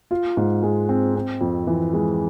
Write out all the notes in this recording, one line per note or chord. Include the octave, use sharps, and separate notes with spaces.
F4
G#2
G#3
C4
C4
F2
E3
G#3